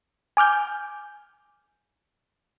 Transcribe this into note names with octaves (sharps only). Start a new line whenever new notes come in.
G#5 D6 F6 G6